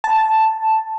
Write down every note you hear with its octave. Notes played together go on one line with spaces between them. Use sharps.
A5